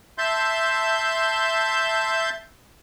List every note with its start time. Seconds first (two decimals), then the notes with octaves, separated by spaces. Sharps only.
0.18 E5 A5 C6 G6